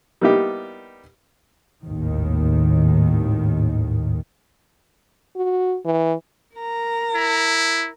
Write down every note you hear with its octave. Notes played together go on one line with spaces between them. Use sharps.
G3 A#3 B3 D#4 E4 G4
G#1 D#2 A2 D#3
F#4
E3
A#4 A#5
E4